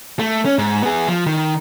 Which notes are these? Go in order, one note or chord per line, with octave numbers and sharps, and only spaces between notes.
A3
C#4
G#2
B3 G#4
F3
D#3